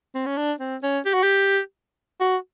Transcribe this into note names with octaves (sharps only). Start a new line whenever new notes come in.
C4
C#4
D4
C4
C#4
G4
F#4
G4
F#4